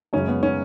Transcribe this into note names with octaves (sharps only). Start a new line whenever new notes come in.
F#2 C#3 G#3 C#4
B3
C#4